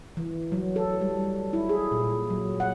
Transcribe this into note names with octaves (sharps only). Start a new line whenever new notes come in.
E3
F#3
A4
G3
E4
G#4
A#2
F#3
F#5